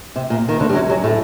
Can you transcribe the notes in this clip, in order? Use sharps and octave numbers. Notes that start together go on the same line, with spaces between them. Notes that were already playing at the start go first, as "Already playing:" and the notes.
C3
A#2
D#3
D2 D3
G3
F#2 F#3
F#2 F#3
A2 A3